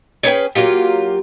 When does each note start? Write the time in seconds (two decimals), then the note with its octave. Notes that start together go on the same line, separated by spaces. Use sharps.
0.23 C#4 G#4 B4 G5
0.55 F#3 A#3 F4 G4